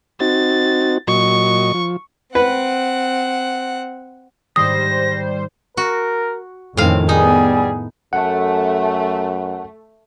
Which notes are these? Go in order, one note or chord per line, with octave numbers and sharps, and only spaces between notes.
C4 D#4 F#4 A6
A#2 F#3 D#5 C#6
F3
C4 B4 F#5
G#2 D#3 G3 C5 D#6 A#6
F#4 A#4
F2 A2 D#3 C4 C#4 F5
G3 B3 D#4 G#4
F#2 A3 F#5